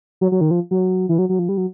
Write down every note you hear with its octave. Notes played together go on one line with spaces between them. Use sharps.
F#3
F#3
D#3
F3
F#3
E3
F#3
F#3
F3
G3
F#3